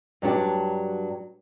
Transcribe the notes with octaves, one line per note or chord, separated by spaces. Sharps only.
G2 F#3 D4 G4